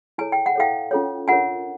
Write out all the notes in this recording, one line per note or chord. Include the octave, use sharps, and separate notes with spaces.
E4 A4 C#5 G#5
G5
F#5
E4 A4 C#5 F5 G5
C#4 F4 A4 C#5
D4 F4 A#4 C#5 F#5 G#5